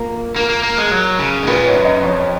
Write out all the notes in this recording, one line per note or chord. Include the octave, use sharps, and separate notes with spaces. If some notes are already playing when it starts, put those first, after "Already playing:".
Already playing: A#3 F4
A#3 A#4
A#3
A#3
G#3
F#3
C#3
G#2
A#2 B4
G#2 C#5
F#2
D#5
F2 C#5